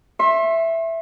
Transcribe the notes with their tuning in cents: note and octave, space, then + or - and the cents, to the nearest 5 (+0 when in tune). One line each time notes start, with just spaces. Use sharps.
E5 +5 C6 +40